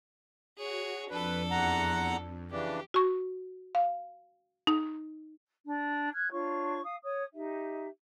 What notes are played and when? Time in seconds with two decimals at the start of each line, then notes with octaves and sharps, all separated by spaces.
0.57 F#4 G#4 C#5
1.10 F2 D4 A4 B4
1.51 E2 F#5 A#5
2.51 C#3 E3 D4 G4
2.94 F#4 C#6
3.75 F5
4.67 D#4
5.66 D4
6.13 F6 F#6 G#6
6.30 D4 F4 C#5 C#6
6.83 F5 D#6
7.02 C#5 D#6
7.32 D#4 G4 E5